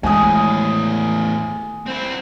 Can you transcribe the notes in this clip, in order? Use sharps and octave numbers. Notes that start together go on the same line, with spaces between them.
E2 A2 D#3 G#3 G#5 D#6
C4 E4